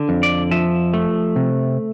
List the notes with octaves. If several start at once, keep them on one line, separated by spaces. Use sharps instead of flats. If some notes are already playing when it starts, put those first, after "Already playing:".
Already playing: D3
F2
D5
F3 E5
A3
C3